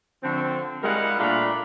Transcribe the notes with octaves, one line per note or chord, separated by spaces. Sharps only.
D3 F3 A3 C4
G3 G#3 E4 A#4 F5 F#5
A#2 A3 D4 F4 A#5 B5